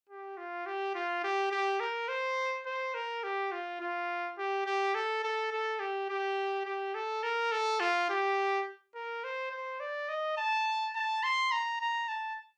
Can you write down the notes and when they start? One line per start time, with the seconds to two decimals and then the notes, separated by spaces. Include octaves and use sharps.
0.09 G4
0.37 F4
0.66 G4
0.95 F4
1.24 G4
1.52 G4
1.80 A#4
2.08 C5
2.66 C5
2.95 A#4
3.24 G4
3.52 F4
3.81 F4
4.38 G4
4.66 G4
4.95 A4
5.24 A4
5.52 A4
5.80 G4
6.10 G4
6.66 G4
6.94 A4
7.23 A#4
7.52 A4
7.80 F4
8.09 G4
8.95 A#4
9.24 C5
9.51 C5
9.80 D5
10.09 D#5
10.37 A5
10.95 A5
11.23 C6
11.52 A#5
11.81 A#5
12.08 A5